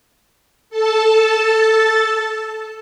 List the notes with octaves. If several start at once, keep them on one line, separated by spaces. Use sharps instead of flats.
A4 A5